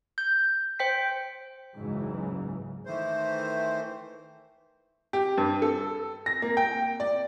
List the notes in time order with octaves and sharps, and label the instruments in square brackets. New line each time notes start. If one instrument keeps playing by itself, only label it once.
[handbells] G6
C5 G5 B6
[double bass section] F#1 C#2 G#2 C#3 E3 F#3
[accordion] D#3 E3 A3 C5
[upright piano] G4
G2
A4
A#6
A#3
G5
D5